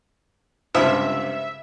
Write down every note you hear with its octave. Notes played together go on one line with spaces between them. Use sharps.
C#2 G2 C3 F3 E5